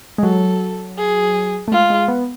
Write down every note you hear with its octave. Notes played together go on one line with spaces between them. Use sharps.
G#3
F#3 A4
G#4
A3
G#3 F4
G#3
B3